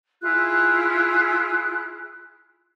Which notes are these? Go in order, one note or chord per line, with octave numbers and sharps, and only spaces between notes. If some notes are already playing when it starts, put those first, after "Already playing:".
E4 F4 G#4 F#6